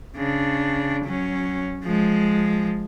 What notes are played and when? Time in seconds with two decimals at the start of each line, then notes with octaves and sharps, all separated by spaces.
0.16 C#3 D4
1.05 F#3 C#4
1.83 F3 G#3